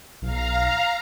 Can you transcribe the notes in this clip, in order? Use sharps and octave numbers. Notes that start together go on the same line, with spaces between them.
B1 F5 A#5